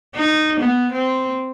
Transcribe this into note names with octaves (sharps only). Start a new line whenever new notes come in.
D#4
B3
C4